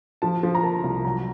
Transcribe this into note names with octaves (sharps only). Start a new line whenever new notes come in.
F3 A5
F3
A#5
A#3 A5
C2
F#3 A#5